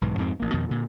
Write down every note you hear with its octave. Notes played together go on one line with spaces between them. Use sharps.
B1 G#2 E3
F2 G#2 G#3 C4
A1 A#3
F2 B2 D#3
A#2 D3